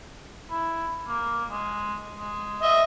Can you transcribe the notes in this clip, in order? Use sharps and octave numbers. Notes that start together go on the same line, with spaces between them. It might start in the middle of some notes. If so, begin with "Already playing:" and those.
E4
A#3
G#3
G#3
D#5 E5